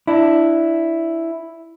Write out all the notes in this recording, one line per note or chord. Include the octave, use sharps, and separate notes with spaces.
D4 E4